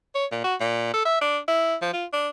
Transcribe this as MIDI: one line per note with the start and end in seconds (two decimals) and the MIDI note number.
0.15 0.26 73
0.32 0.41 46
0.44 0.55 66
0.61 0.92 46
0.94 1.05 69
1.06 1.19 76
1.21 1.38 62
1.48 1.75 64
1.82 1.89 53
1.93 2.05 65
2.13 2.29 62